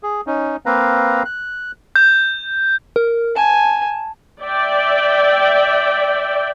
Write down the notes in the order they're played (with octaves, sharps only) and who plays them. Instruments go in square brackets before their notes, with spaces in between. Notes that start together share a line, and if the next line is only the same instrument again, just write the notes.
[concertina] G#4
C#4 D#4
A#3 C4 B4 F5 A#5
F#6
[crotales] G6
[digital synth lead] A#4
[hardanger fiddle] G#5 [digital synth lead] A5
[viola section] D5 E5 G5